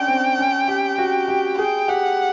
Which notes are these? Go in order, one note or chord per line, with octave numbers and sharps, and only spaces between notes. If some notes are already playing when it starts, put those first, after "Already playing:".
Already playing: C#4 D4 G5
C4
C#4
G4
F#4
G4
G#4 G5
G4 F#5